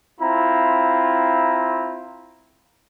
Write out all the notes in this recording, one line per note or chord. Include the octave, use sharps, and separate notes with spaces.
C4 E4 F4 A#5